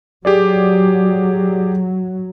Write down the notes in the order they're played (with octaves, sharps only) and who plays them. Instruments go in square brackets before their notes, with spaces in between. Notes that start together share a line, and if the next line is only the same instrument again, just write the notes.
[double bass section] F#3 [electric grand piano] G4 G#4 D5